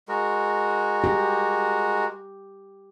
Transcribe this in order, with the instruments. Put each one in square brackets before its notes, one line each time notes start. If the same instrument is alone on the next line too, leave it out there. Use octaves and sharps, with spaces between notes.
[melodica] G#3 F#4 A#4
[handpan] G4